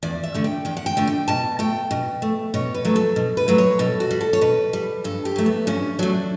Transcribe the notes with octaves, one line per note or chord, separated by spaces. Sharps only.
E2 D5
E5
D3 A3
G5
E2 G5
F#5
G5
D3 A3
G5
B2 A5
A3 G5
B2
A3
B2 C#5
B4
F#3 A3
A4
B2
B4
F#3 A3
C#5
B2 A4
F#4
G3
A4
C#5
B2 B4
G3
G2 A4
G4
F#3 A3
B3
G2 C#4
F#3 A3 D4